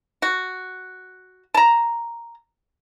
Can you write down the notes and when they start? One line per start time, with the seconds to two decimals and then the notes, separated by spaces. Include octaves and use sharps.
0.22 F#4
1.54 A5 A#5